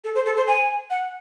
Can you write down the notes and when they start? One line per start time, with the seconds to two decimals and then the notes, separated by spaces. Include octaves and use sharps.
0.04 A4
0.15 C5
0.26 A4
0.37 C5
0.47 G#5
0.90 F#5